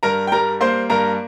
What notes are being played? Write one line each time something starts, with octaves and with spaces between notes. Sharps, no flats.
G2 A#4 A#5
G5
G3 A#4 A#5
A#3 C5 C6
G2 A#4 A#5